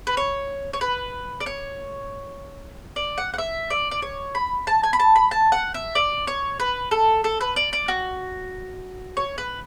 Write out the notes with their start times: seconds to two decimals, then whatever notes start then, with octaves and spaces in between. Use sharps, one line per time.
0.07 B4
0.17 C#5
0.73 C#5
0.81 B4
1.40 D5
1.46 C#5
2.96 D5
3.18 F#5
3.34 F#5
3.38 E5
3.70 D5
3.91 D5
4.02 C#5
4.35 B5
4.67 A5
4.83 G#5
4.93 B5
5.00 A5
5.16 B5
5.31 A5
5.52 F#5
5.74 E5
5.95 D5
6.27 C#5
6.60 B4
6.91 A4
7.24 A4
7.41 B4
7.56 D5
7.73 D5
7.88 F#4
9.17 C#5
9.38 B4